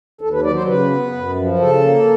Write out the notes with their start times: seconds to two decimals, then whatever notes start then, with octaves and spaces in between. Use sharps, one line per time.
0.21 D#2 A4
0.33 B4
0.44 F#3 D5
0.55 C5
0.67 C#3 B4
0.90 B3
1.12 F#2
1.35 F3
1.59 C#3 A4
1.81 A#3